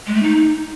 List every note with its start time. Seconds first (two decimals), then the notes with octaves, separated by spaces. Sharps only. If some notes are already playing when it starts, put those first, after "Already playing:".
0.07 G#3
0.15 A3
0.23 D#4